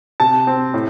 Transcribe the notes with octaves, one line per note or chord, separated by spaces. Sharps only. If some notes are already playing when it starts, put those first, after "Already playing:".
C3 A5
C4
A2